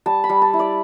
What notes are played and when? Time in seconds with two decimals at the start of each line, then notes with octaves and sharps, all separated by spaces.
0.06 G3 A5
0.24 B5
0.29 G3
0.42 A5
0.53 E4
0.59 D5